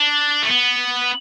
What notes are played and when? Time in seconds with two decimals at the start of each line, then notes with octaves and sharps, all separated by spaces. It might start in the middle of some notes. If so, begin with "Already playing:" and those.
Already playing: D4
0.43 A3
0.48 B3